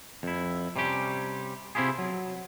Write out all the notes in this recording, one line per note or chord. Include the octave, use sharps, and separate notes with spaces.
F2 E4
C3 G3 C#4 G4
C3 C4 E4 F4 G4 G#4
F#3